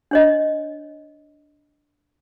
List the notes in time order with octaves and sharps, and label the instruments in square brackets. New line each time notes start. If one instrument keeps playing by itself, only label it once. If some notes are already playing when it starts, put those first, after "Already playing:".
[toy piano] D4 C#5 D#5